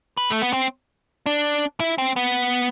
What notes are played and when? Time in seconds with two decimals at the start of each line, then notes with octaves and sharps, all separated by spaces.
0.17 B4
0.30 A3
0.42 B3
0.53 C4
1.26 D4
1.80 E4
1.98 C4
2.16 B3